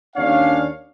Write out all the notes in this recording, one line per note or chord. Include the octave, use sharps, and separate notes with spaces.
D#2 C#4 D4 C#5 F5